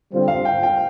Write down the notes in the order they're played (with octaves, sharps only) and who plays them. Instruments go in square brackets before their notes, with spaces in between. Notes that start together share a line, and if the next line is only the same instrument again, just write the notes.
[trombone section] D3 G3 C4 F4
[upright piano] F5
G5
G5